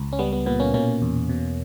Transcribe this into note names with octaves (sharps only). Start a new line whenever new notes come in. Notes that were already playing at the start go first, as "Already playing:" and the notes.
Already playing: C#2
C#4
G3 B3
B3
A#2 B3
A#3 C#4
B2 A#3 C#4
E2
B2